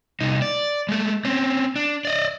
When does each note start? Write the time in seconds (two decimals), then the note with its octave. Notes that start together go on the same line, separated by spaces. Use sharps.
0.20 C2 D#4
0.42 D5
0.89 G#3 A3
1.25 C4 C#4
1.76 D4
2.05 D5 D#5